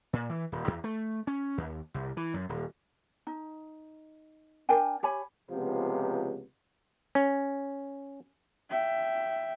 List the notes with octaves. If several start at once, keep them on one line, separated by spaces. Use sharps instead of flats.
A#2
E3
D#1
E2
A3
C#4
D#2
C2
E3
F#2
D#1
D#4
D4 A#4 G5 G#5
G4 C#5 G#5 B5
C#2 C3 F3 B3
C#4
E5 G5